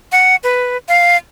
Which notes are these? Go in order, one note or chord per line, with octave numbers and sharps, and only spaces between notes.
F#5
B4
F5